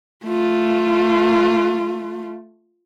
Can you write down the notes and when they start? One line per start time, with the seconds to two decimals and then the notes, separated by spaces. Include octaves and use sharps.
0.25 A3 F4